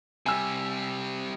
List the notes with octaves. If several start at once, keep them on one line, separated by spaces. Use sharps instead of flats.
C3 G3 G#5 E6